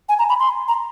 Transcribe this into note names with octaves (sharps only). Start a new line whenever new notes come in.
G#5
A#5
B5
C6
A#5